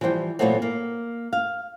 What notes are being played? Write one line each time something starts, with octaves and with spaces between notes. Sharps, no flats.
E3 F3 G3 C5 G5
A#2 E3 F#3 A3 B3 C4
A#3
F5